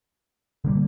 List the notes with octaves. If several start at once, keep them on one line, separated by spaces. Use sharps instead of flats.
D3 G3 A#3